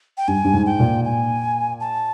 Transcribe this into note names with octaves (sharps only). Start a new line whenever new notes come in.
G5
G2 G#5
G2
G#2
G5
A#2
G#5
A5